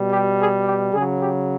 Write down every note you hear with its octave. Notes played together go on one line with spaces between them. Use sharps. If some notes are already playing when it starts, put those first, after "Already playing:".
Already playing: B2 G3
G4
G#4
G4
C#3 F#3 G#4
G4